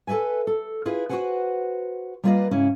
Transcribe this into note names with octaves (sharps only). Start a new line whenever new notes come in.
A4 B4 D5 E5 G#5
A4
E4 F4 G#4 B4
F#4 A4 B4 C5 F#5 G#5
G3 A#3 F4 B4 D5 D#5
G#2 C#3 C#4 E4